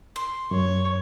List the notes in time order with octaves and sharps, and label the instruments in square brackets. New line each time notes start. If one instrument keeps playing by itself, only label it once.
[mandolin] C6
[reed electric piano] F#2 [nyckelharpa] C#5